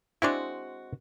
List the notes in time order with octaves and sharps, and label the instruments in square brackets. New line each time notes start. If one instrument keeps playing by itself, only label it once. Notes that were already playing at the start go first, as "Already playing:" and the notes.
[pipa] G#3 C4 F#4 [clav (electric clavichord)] D4 E4